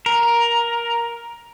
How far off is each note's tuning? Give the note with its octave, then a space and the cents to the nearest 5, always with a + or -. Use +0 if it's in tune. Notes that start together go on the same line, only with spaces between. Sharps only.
A#4 +10